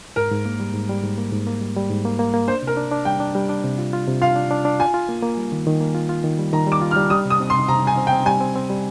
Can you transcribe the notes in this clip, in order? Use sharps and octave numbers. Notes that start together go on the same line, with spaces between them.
G#2 A#4
G#2
A#3
G3
G#2
G3
G#2
A#3
G#2
A#3
G3
G3
G#2
A#3
A#3
A#3
D4 C5
C3 A#4
D4
D4
G3 G5
D4
G3
D4
C3
F4
F4
C3
F4 F5
D4
D4
D4
F4 G#5
F4
A#3
A#3
G3
D#3
D#3
A#3
F4
F4
D#3
G3
D#3 A#5
G3 D6
F4
F6
G3
G3 D#6
C3
D#6
C4
C6
C3
C3 A#5
G3 G#5
C4
G5
C4
G3 G#5
C4
C4
G3